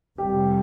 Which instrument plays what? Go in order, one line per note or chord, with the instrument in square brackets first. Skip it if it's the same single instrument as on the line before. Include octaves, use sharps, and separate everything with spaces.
[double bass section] F1 F2 C3 G3 [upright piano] G4